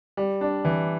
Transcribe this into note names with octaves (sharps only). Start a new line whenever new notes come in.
G3
D4
E3